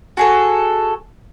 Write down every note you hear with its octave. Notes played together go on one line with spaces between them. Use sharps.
F#4 G#4 A4